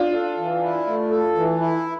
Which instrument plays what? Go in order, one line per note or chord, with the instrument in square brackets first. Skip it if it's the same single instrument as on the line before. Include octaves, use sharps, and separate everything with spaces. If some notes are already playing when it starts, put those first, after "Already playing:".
Already playing: [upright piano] D4 F4
[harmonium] A4
E3
E4
A3
A4
E3
E4